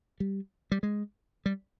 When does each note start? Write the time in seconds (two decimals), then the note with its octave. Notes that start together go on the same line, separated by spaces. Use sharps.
0.20 G3
0.72 G3
0.83 G#3
1.46 G3